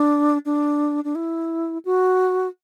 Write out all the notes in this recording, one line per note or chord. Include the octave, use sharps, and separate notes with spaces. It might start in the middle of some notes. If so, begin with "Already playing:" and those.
Already playing: D4
D4
D4
E4
F#4